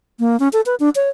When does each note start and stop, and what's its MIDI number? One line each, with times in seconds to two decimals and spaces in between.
0.20 0.39 58
0.40 0.48 61
0.53 0.61 69
0.66 0.75 71
0.80 0.89 62
0.96 1.09 73